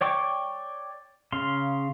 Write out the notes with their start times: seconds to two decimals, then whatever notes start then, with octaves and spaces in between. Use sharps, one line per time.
0.01 C#5 D5 G5 C#6 D6
1.32 C#3 F5 C6